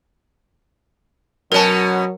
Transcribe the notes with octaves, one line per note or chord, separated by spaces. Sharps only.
B2 F#3 C#4 A#4 A5